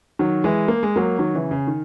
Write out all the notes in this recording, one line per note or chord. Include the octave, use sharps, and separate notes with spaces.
D#3 F#3
E3 G#3
A#3
G#3
F#3 A#3
D#3 F#3
C#3 E3
C#3
D#3